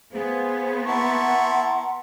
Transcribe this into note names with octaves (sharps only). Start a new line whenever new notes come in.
B3 G#4 C5 F5
E4 F#5 A5 A#5 C6 C#6